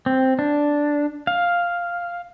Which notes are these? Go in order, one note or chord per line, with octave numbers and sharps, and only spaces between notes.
C4
D4
F5